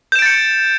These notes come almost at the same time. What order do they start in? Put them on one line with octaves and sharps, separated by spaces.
G6 E7 D7 A6 C#7